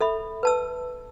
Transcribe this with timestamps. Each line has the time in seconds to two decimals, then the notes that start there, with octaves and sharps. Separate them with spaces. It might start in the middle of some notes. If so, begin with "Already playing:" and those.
0.01 A4 E5 B5
0.43 B4 A5 E6